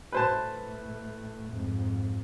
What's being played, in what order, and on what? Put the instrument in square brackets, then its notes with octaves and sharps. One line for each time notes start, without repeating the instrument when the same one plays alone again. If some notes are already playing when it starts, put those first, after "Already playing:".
[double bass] A2 A3 [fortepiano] B4 C5 A5
[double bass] F2 G#2